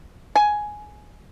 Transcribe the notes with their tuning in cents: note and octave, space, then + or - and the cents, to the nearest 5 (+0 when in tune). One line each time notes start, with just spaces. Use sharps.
G#5 +10